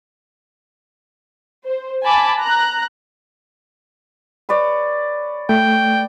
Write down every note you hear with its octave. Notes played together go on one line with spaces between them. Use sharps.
C5
G#5 A5 B5 D6
A#5 F#6
B4 C#5 D5
A3 G5